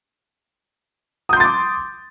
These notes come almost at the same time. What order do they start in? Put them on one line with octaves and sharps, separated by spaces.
D#6 G6 C6 A6 D6